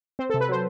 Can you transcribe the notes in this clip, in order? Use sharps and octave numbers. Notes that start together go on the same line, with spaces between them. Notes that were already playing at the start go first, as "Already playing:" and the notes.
C4 C5
A4
C3
B4
F#3 C5